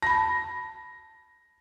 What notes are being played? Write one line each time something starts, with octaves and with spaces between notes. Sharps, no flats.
A5 B5 A#6